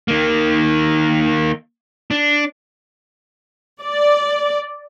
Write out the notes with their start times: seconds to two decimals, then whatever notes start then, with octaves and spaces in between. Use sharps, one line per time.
0.08 D#3 A#3
2.11 D4
3.82 D5